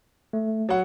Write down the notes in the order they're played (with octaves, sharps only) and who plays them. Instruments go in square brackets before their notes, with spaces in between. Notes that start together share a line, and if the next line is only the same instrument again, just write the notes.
[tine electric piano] A3
[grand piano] F#3 F#5